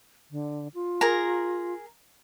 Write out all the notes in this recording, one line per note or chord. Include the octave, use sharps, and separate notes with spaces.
D3
F4
G#4 A#4 A#5